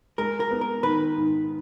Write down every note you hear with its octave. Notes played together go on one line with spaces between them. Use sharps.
G#3 A#4
A#4
B3
A#4
D#3 B4
G#2